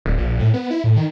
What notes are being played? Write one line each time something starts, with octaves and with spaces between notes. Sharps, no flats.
D1
A#1
A2
B3
E4
A2
D#3